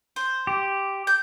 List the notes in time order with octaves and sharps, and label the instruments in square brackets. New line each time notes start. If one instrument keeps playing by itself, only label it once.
[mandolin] C5
[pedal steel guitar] G4
[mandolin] G6